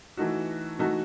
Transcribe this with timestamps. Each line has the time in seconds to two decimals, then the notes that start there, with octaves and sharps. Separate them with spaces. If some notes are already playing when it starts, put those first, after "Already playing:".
0.17 E3 A3 D#4 F#4
0.79 E3 A3 D#4 F#4